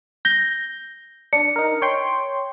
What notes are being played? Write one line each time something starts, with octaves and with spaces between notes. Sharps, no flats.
G6 A#6 G7
D4 C#7
D#4 A#4
C#5 G5 C6